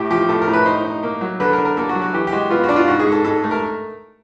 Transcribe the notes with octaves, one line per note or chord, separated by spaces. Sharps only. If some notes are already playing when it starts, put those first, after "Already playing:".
Already playing: A2 G4
F3 G4
A2 A4
A#4
A2
B4
D#4 C5
D#4
A#3
F#3
D3 B4
A#4
D3
A#4
A#3 A4
F#4
F#3
F#4
E3 G4
G4
G#3 F#4
B3 F4
F#4
D4
F4
G#2 F#4
G#4
G#2
A4
G#2 A4
A3
A#4